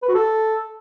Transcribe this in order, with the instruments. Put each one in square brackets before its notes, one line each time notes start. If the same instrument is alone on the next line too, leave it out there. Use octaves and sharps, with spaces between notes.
[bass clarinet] B4
F#4
A4